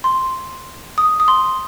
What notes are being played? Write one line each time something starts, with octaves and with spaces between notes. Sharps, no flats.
C6
D#6
D#6
C6